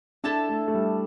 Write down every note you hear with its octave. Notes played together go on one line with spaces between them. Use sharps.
D4 E4 A4 E5 A5
A3
A3
G3